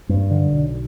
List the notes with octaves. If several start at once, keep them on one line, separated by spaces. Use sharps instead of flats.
G2
D3
B1